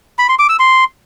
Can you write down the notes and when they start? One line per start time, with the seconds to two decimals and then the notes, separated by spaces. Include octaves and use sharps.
0.19 B5
0.29 C6
0.39 D6
0.49 E6
0.59 C6